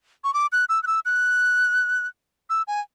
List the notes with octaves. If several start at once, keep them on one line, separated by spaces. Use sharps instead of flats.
C#6
D6
F#6
E6
F#6
E6
F#6
E6
G#5